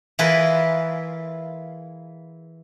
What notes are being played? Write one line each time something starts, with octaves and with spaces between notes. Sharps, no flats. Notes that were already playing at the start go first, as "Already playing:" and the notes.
E3 E4 F4 G#4 A#4 B4